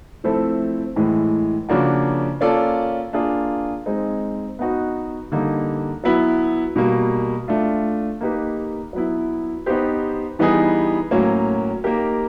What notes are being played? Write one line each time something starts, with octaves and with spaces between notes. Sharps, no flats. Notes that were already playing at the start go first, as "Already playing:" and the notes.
F3 A3 C4 E4 A4
A2 E3 G#3
C#3 F3 A#3 D4 F#4
A#3 C#4 F4 A4 D5
A#3 D4 F4 G#4
G#3 C4 D#4
B3 D#4 F#4
D3 G3 A#3 D#4
F#3 B3 E4
B2 G3 A#3
A3 D4 F4
A#3 D#4 G4 B4
F#3 B3 E4
B3 D#4 G4 C5
E3 G3 B3 D#4 G#4
A2 F#3 A#3 C#4
A#3 D#4 G4 A#4